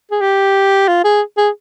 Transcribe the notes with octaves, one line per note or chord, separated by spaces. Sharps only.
G#4
G4
F4
G#4
G#4